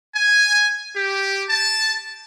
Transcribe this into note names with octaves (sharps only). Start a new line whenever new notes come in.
G#5
G4
A5